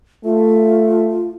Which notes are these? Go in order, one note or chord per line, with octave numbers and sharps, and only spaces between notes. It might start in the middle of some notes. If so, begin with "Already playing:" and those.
A3 F4